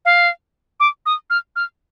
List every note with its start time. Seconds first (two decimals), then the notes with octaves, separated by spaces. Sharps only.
0.05 F5
0.80 D6
1.06 D#6
1.30 F6
1.56 F6